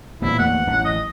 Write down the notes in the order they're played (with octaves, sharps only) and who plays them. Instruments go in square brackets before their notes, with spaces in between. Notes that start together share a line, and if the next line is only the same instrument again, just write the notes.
[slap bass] E2 A#2 [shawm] E4
[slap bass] E2 A3 A#3 [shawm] F#5
[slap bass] A1 F#3 C#4
[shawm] D#5